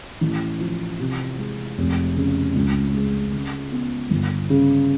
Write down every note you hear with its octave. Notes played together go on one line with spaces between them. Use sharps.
A1
F3
C3
G#3
F1
C#3
C#2
G#3
C#3
B3
G1
C#3